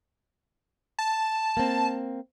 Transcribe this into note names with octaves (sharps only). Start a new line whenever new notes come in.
A5
A#3 C4